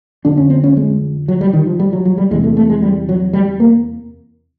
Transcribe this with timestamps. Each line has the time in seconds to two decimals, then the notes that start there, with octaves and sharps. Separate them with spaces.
0.25 F2 D3 D4
0.37 C#4
0.50 C4
0.64 C#4
0.77 G#3
1.28 F#3
1.41 G3
1.53 D#3
1.66 F3
1.80 G3
1.93 F#3
2.05 F#3
2.18 G3
2.31 E2 G#3
2.35 C3
2.44 A3
2.57 A3
2.70 G#3
2.82 G3
3.09 F#3
3.33 G3
3.60 A#3